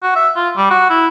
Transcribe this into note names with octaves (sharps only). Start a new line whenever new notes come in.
F#4
E5
F4
G3
F#4
E4